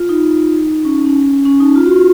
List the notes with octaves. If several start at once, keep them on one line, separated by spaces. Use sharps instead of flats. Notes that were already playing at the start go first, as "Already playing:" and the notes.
Already playing: F4
D#4
C#4
C#4
C#4
D#4
F4
F#4
F4